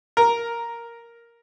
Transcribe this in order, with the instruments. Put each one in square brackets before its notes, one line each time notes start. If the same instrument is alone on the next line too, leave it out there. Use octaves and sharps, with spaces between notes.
[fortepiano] A#4